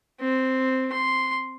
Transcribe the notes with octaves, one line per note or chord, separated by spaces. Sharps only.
C4
C6